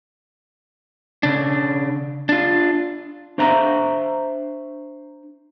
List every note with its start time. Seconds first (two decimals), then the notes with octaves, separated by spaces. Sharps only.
1.23 C#3 D4
2.29 D4 F4
3.38 D4 C5 E5 A#5